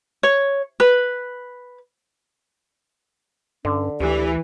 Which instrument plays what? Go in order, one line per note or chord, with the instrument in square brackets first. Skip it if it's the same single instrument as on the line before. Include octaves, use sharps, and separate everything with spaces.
[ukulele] C#5
B4
[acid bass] G2 [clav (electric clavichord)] D3 [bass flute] C#4
[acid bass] D2 [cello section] E3 [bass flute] G4